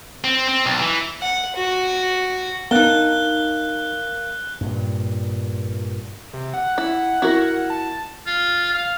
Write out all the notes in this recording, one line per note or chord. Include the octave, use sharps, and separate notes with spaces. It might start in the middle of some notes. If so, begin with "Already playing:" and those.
C4
C4
B1
E3
F#5
F#4
B3 D4 D#4 A#4 F5 F#6 G7
G2 A#2
C3
F#5
E4
E4 F#4 A#4
A5
F4
F5